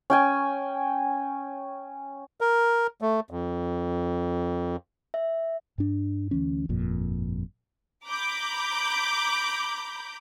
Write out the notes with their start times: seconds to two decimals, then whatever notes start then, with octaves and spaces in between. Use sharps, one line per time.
0.10 C#4 G5 G#5
2.41 A#4
3.02 A3
3.31 F2
5.14 E5
5.78 G2 D4
6.31 D2 E3 C#4
6.69 G1 F2 A#2
8.07 A#5 B5 D6 G6